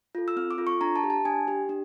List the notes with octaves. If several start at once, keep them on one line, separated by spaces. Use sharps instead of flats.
F4 A4
E6
C4 F6
D6
F4 A4
C#6
D4 A#5
A5
G4
A5
D4 G#5
G4
D4